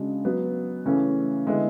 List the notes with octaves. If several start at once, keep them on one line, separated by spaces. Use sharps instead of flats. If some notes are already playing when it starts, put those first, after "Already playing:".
Already playing: C#3 G#3 D4 F#4
F#3 B3 F#4
C#3 E3 A3 C#4
D3 G#3 B3 E4